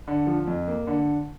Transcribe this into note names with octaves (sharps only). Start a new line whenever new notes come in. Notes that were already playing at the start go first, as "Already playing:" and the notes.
D3
F3
F2
A#3
D3